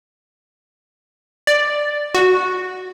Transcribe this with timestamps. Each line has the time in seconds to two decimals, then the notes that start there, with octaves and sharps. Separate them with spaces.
1.47 D5
2.15 F#4